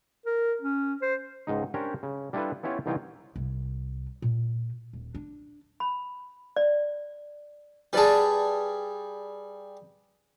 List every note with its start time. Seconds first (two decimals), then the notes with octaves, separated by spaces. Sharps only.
0.26 A#4
0.62 C#4
1.02 C5
1.47 C#2 G#2 D#4
1.74 C#4 D4 G4 A#4 C5 C#5
2.03 C#3
2.33 G3 D4 E4 F4 A4 B4
2.63 B3 C#4 E4 F4 G4 C#5
2.86 C2 E3 D#4 F4 C#5 G5
3.36 C2
4.22 A#2
4.93 D#1
5.14 D4
5.80 B5
6.56 D5
7.93 G3 G#4 B4 D5 A5